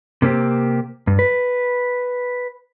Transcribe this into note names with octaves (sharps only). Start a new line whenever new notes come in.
C3 A#3 C4 G4
G2
B4